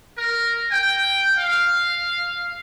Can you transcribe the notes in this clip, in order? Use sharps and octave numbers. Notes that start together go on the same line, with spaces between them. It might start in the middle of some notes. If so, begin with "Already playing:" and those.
A#4
G5
F5